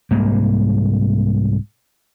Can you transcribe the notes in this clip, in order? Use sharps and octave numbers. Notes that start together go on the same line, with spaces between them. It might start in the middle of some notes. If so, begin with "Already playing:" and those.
C2 G#2 A#3